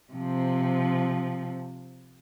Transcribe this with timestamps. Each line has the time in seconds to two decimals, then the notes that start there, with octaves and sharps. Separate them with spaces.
0.13 C3 F3